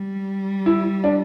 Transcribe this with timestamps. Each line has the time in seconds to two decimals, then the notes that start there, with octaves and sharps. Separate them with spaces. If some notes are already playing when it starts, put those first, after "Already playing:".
Already playing: G3
0.66 E4
1.04 D4